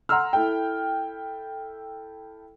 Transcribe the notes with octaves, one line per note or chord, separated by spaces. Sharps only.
F#5 A#5 C6 E6 F6
E4 A4 G5